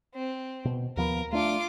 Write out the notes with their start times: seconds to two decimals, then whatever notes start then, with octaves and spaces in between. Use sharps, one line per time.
0.15 C4
0.65 B2
0.97 D#2 F3 B3 A#4
1.33 A3 D4 F4 D6